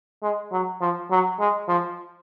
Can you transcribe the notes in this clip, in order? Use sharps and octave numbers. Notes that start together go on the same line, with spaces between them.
G#3
F#3
F3
F#3
G#3
F3